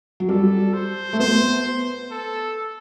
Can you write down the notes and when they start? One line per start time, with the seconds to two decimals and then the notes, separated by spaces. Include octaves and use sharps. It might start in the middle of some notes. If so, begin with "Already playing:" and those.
0.20 F#3
0.29 G3 A4
0.74 C5
1.13 A3
1.20 B3 C5
2.11 A4